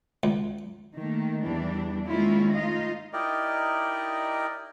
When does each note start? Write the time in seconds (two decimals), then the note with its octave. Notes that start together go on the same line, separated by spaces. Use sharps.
0.23 C#2
0.98 D#3 A3 A#3
1.45 E2 E3 G3 D4
2.07 D#3 G#3 A#3 C#4 E4 F4
2.55 A3 D#4 F4 D#5 F5
3.13 D#4 E4 G4 A#4 D5 D#5